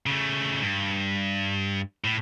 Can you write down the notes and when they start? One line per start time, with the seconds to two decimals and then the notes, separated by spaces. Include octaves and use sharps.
0.06 C#3 A3
0.62 G2
2.04 A2